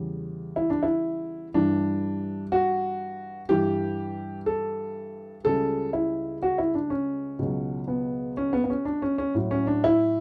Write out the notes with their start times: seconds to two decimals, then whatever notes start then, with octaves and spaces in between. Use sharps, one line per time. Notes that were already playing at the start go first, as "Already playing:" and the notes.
Already playing: E2 C#3 G3
0.56 E4
0.70 D4
0.83 E4
1.54 G2 E3 G3 D4
2.52 F#4
3.49 G2 E3 G3 G4
4.46 A4
5.44 C#2 C#3 G3 A4
5.93 E4
6.42 F#4
6.58 E4
6.75 D4
6.90 C#4
7.39 C#2 B2 F#3
7.88 B3
8.37 C#4
8.53 B3
8.64 B3
8.70 C#4
8.85 D4
9.02 C#4
9.18 C#4
9.35 A2 F#3
9.51 C#4
9.67 D4
9.84 E4